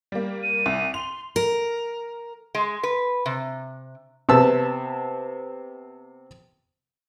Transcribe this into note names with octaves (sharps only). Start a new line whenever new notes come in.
G3 A#3
D#7
C2
C6 F7
A#4
G#3
B4
C3
C3 B3 A5 E6